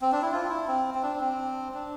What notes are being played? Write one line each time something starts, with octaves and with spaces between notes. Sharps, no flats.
C4
D4
E4
F4
E4
C4
C4
D4
C4
D4